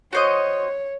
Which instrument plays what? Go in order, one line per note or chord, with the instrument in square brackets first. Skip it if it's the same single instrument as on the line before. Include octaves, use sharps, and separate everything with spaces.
[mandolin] F#4 C5 D#5 [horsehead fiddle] C#5